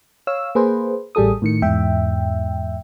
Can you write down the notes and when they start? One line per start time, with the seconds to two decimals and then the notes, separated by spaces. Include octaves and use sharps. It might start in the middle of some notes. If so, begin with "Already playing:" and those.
0.27 C#5 F5 E6
0.55 A#3 G#4 B4 C5
1.15 A1 G3 G#4 A4 D#6
1.42 A2 D#3 C#7
1.62 E2 G#2 E5 G5